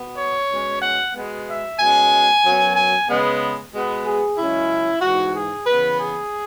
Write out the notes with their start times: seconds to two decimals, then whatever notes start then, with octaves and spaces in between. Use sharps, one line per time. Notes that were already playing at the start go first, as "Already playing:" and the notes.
Already playing: B2 B3
0.18 C#5
0.51 B2 G#3 C#4
0.82 F#5
1.14 B2 G#3 B3
1.47 E5
1.79 B2 G#3 C#4 G#5
2.44 F#2 F#3 B3
2.75 G#5
3.09 C#3 G#3 B3
3.73 B2 G#3 B3
4.05 G#4
4.37 F#2 C#3 G#3 C#4 E4
5.02 G#2 E3 G#3 F#4
5.35 G#4
5.66 C#3 E3 B3 B4
5.98 G#4